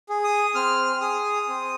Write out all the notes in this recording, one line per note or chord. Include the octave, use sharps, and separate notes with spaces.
G#4
D#6
C4 F6
G#4 D#6
C4